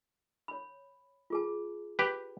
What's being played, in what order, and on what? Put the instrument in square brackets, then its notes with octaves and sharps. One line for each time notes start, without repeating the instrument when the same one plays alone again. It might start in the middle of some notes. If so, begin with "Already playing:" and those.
[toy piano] C#5 B5
F4 G#4 A5
[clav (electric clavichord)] G4 B4